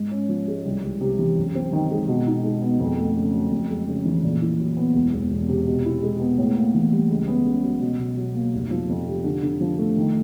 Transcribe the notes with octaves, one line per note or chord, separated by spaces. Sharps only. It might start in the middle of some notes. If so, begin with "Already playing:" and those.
Already playing: G#2
C#4
F3
G#3
C2
C2
C3
E3
F#2
C4
D#3
G#3
B2
D#4
G#3
B3
F2
A3
C#3
F#3
F2
G#3
C#3
E3
A#2
E4
F#3
B3
E1
E1
E2
C3
B2
E4
G#3
B3
A2
A#3
E3
G3
C#2
B3
C#3
F#3
B2
B2
F#3
A#3
F1
F3
F2
C3
D3
D3
F3
A3
D#3